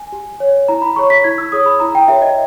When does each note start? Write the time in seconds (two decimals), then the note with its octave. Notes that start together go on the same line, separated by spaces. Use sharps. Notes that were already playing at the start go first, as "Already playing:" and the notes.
Already playing: G#5
0.12 G4
0.40 C#5
0.68 E4 A#5
0.82 B5
0.96 G#4 C#5 C#6
1.10 B6
1.24 E4 G#6
1.38 E6
1.52 G#4 C#5 D#6
1.66 B5
1.80 E4 A#5
1.95 G5
2.08 G4 A#4 C#5 E5
2.22 D#5